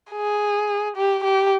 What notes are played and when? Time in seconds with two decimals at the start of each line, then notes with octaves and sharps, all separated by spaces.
0.12 G#4
0.97 G4
1.24 G4